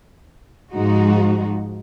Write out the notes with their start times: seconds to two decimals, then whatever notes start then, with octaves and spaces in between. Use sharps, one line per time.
0.72 G#2 F3 G#3 D#4 F#4